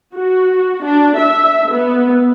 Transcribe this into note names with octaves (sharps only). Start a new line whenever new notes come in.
F#4
D4
E5
B3